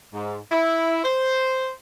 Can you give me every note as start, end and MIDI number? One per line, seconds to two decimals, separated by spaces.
0.13 0.38 44
0.51 0.99 64
1.04 1.70 72